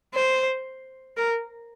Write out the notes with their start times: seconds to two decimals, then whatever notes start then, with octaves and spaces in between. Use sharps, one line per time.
0.15 C5
1.17 A#4